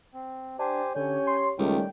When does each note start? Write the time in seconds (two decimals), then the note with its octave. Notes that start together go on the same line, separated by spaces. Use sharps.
0.14 C4
0.59 D4 G4 C5 G#5
0.96 D3 C#4 G4 C#5 G#5 G6
1.27 C6
1.59 C#2 D#3 G3 A3 C#4 G5